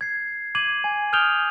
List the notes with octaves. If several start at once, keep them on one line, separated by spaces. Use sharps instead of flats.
G#6 C7
D6 G#6 D#7 F#7
G#5
D#6 F6 G6 D7 F7 G7